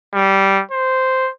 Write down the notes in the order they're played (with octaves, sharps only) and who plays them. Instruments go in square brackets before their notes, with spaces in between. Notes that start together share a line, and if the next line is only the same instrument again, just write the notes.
[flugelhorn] G3
C5